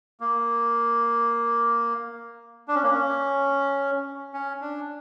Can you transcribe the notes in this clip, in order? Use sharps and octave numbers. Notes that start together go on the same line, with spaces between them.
A#3
D4
C#4
A#3
C#4
C#4
D4